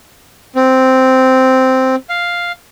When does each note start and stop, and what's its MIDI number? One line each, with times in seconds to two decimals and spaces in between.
0.55 1.96 60
2.09 2.52 77